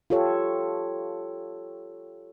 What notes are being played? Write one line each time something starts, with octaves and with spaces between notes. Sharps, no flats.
F4 G4 A4 C#5